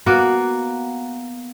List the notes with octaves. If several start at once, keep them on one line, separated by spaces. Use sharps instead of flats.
A#3 B3 F#4